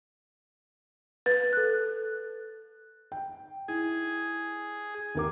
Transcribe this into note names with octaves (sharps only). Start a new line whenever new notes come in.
B4 A6
A4 F#6
G5
E4 G#4
D#2 A#4 D6